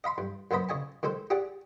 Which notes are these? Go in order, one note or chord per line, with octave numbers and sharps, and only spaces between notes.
D#5 F5 B5 C6
G2
F#2 A#3 B3 C5 D#5 B5
C#3 D#5 G#5 A5
D#3 G#3 A4 C5
G4 G#4 D5 F#5